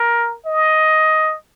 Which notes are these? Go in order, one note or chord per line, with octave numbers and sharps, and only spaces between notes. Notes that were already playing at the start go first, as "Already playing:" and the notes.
Already playing: A#4
D#5